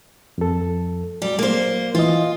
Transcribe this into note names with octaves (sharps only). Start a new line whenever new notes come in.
F2 A4
F#3 G3
A#3 C5
E3 F4 D#5